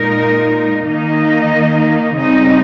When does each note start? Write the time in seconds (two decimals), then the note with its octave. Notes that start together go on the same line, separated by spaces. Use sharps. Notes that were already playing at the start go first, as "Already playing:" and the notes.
Already playing: A#2 G#3 D#4 A#4
0.84 D#3 A#3 D#4 D#5
2.16 C#3 G3 C4 D#4 D#5